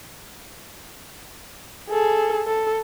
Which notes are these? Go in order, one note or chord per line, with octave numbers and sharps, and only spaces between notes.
G#4 A4
A4